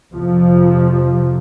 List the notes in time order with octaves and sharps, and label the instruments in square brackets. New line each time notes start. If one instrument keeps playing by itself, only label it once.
[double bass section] F2 C3 F3